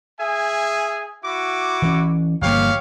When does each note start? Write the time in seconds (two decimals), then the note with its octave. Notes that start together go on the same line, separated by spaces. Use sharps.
0.19 G#4 E5 G#5
1.24 E4 F#4 D6
1.82 E3 C#4
2.42 G1 F3 A#3 G4 C#5 F5